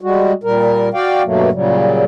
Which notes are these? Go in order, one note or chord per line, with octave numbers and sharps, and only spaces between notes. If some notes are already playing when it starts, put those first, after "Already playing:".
G3 G#3 F#4
A#2 G3 A#4
F#4 D5 F5 G5
G2 B2 F#3 A3 A#3
A#2 C#3 F#3 G3